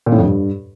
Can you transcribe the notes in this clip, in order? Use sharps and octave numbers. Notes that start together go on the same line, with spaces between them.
A#2
A2
F2
G2